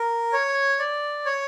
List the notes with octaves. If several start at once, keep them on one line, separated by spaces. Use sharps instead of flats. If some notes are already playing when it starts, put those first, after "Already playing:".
Already playing: A#4
C#5
D5
C#5